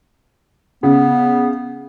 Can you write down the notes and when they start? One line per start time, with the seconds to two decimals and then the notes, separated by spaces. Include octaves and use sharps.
0.83 C#3 B3